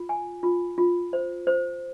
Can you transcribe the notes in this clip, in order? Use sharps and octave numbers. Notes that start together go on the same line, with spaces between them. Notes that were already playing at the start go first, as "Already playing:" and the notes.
Already playing: F4
G#5
F4
F4
C5
C5